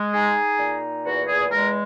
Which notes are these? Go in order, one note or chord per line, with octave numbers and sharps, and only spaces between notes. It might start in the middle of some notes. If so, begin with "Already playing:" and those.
Already playing: G#3
D#4 G#4
A#2
E2 F#4
G#4
G#3 A#4